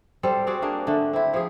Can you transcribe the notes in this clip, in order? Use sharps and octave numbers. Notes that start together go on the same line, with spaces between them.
G3 C4 A4 C5
C4 F#4 G#4 D5
A#3 D4 G#4
D3 A3 D4
C4 E4
F3 G#4